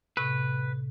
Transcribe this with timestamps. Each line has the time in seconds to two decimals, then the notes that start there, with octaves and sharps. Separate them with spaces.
0.17 A2 C3 B4